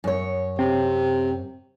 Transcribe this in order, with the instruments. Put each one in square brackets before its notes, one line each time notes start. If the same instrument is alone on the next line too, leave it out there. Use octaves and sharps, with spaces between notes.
[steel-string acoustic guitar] F#2 C#5
[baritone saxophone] C3 [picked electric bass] C4